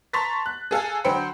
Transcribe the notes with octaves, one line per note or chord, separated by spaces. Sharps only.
A5 A#5 C6 C#6 A6 B6
F#6
G#4 A4 F5 G#5
D3 F#3 C5 G5 B5 C#7